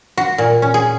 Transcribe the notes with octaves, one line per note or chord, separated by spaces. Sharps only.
F#4
A#2
C#4
G#4